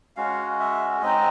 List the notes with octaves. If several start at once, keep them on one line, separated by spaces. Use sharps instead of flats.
G#3 C#4 F#4 F5
E5
G#3 C4 D#4 D#5